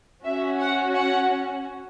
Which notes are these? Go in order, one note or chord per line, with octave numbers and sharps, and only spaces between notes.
C#4 F#4 E5
F#5
F#5